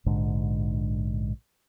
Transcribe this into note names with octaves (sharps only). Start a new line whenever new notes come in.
A#1 G#2 D3